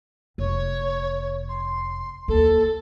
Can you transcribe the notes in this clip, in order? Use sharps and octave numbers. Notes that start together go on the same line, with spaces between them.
F1 C#5
C6
D#2 A4